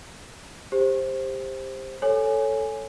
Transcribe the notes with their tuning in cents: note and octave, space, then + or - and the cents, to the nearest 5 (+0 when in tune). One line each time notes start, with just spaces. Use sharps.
G4 +20 C5 +10
A4 +0 C#5 +0 G#5 +0